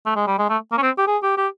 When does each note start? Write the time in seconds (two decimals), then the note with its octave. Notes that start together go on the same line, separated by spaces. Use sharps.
0.06 A3
0.16 G#3
0.27 G3
0.38 G#3
0.49 A3
0.72 A#3
0.77 C#4
0.82 C4
0.98 G4
1.07 G#4
1.23 G4
1.37 G4